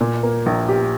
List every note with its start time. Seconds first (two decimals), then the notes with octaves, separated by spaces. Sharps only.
0.01 A#2
0.23 A#3
0.46 A#1
0.69 G4